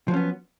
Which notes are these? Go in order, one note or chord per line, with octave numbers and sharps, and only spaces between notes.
F3 F#3 B3 C#4